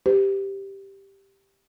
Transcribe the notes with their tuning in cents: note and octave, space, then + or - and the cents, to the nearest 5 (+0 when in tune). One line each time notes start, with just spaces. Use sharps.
G4 +0 C5 -45